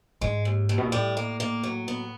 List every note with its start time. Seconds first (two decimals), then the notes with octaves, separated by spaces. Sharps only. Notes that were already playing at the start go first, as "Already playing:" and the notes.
0.21 G#2 G#3
0.45 D#2
0.69 D#2
0.78 B2
0.85 A#2
0.92 A2 G3
1.17 A#3
1.40 A#3
1.63 F#3
1.88 B3